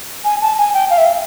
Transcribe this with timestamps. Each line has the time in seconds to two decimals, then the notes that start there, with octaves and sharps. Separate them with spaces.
0.25 G#5
0.42 A5
0.58 G#5
0.74 G5
0.90 F5
0.98 E5
1.06 F5